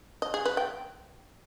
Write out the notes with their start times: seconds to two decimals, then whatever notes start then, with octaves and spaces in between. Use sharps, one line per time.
0.22 D#5
0.34 G#4
0.45 B4
0.57 G5